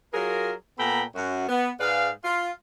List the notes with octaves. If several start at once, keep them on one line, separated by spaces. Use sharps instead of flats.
F#3 F4 G#4 A#4
A#2 B3 A4 G5 A#5 B5
F#2 F#4
B3
G#2 G#4 B4 D5 F5
F4